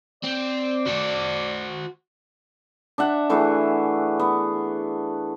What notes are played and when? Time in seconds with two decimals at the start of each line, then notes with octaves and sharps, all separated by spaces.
0.23 C4 D5
0.87 F#4 C5
2.98 D4 E5 F#5
3.30 E3 A3 F#4 G#4
4.20 B3